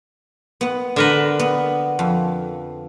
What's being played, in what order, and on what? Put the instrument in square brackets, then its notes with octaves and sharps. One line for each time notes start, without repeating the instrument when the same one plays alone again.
[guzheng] B3 F#5
[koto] D3 A#4 B4
[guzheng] B3
F2